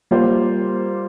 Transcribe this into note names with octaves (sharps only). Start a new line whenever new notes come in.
G3 A#3 F4 C5